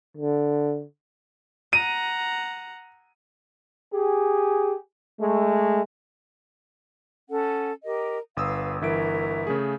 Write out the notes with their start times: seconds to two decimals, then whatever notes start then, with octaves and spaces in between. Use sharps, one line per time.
0.17 D3
1.73 F#5 A#5 D#7
3.93 G4 G#4
5.20 G#3 A3
7.29 C#4 A4 F#5
7.84 G4 A#4 D#5
8.37 G1 B4 F5 D#6 E6
8.81 G1 E3 F#4 A#4 E5 D7
9.47 C#3 A3 G#4